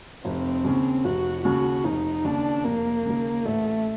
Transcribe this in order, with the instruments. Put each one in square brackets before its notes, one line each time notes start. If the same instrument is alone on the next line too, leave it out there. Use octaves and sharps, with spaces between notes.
[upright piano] F1 [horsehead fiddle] C4
[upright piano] D#2 C#3
[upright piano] F1 [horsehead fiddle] F#4
[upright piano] D#2 C#3 [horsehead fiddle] F#4
[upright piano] F1 [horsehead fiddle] D#4
[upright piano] D#2 C#3 [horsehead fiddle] D4
[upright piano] F1 [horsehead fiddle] A#3
[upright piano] D#2 C#3
[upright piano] A1 [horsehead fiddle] A3